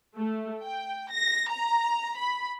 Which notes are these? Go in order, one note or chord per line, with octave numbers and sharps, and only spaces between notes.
A3
G5
A#6
A#5
B5